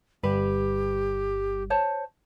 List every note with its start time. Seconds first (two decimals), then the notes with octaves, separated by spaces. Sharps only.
0.23 G1 G3 G4 B4
1.70 C5 C#5 A5